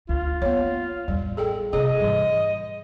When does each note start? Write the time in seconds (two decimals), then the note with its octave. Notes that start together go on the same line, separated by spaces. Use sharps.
0.09 D2 F4
0.42 A#3 B3 C#5
1.08 A1 E2 G3
1.37 G#4 A4 G5
1.73 C3 A#3 G#4 D#5
2.00 G#2 E3 G3